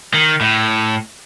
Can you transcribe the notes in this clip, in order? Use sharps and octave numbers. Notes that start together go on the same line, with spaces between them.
D#3
A2